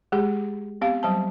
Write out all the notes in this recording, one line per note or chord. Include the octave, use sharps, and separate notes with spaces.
G#3 G4 G#4
B3 C4 G4 F5
F#3 G3 C5 A5